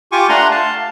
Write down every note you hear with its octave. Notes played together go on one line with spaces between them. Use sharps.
F4 G4 G#5 C#6 D6
A3 D4 F#5 A#5 C6
F5 A5